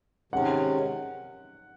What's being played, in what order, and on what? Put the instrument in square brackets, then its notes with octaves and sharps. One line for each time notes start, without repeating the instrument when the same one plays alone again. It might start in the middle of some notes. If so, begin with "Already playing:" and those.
[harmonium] C3 D#3 G#3 C#4 [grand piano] F#5